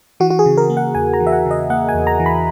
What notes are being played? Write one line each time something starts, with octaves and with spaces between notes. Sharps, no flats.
E3 F#4
F#4
G#4
C#3
A#4
A#3
F#5
E2 G#5
A#5
E3
E5
F#5
C#3
D#5
A#3 F#5
G#5
E2
A#5
E3
B5